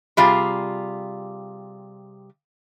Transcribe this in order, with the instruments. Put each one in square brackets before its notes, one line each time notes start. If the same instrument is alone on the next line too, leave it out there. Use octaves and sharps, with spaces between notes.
[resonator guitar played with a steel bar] C3 G3 F4 G#4